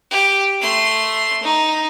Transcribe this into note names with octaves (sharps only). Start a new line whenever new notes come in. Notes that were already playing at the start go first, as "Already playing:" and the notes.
G4
A3 C6
D#4